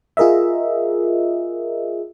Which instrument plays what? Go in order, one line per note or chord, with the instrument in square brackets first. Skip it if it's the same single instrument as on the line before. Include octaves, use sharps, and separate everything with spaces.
[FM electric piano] F4 G#4 A#4 D#5 E5